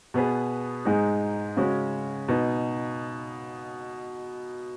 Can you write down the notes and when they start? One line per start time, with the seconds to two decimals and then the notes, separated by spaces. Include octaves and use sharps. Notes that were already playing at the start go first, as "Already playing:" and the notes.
0.14 B2 B3 G#4 B4
0.85 G#2 G#3 D#4
1.57 C#3 G#3 C#4 F#4
2.28 B2 B3 D#4